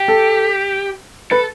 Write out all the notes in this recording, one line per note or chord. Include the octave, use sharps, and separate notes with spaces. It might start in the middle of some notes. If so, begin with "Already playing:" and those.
Already playing: G4
A4
A4 B4